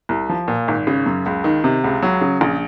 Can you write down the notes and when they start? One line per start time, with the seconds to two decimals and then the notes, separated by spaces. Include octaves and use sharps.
0.09 C2
0.29 F3
0.48 A#2
0.68 G#1
0.87 C#3
1.06 F#2
1.26 C#2
1.44 D#3
1.64 C3
1.84 C#2
2.02 F#3
2.21 C#3
2.41 A#1